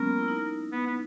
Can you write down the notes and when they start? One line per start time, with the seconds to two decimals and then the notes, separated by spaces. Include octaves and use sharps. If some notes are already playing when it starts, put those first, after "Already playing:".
Already playing: F#3 G#3 A#3 B3 C#4 A#4
0.19 E4
0.28 D#4
0.72 B3
0.87 B3